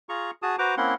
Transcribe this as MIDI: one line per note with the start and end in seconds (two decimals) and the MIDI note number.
0.09 0.31 65
0.09 0.31 68
0.09 0.31 82
0.09 0.31 85
0.42 0.56 66
0.42 0.56 68
0.42 0.56 81
0.42 0.56 87
0.59 0.75 66
0.59 0.75 71
0.59 0.75 72
0.59 0.75 82
0.59 0.75 86
0.77 0.94 58
0.77 0.94 60
0.77 0.94 61
0.77 0.94 64
0.77 0.94 78
0.77 0.94 84